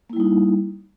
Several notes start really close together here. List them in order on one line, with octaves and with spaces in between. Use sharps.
A#3 E4 G3 D#4